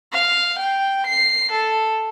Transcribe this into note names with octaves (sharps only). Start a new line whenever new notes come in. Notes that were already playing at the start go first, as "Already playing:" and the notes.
F5
G5
C7
A4